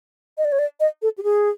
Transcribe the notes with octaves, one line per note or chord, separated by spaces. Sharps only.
D#5
D5
C#5
D5
D#5
A4
G4
G#4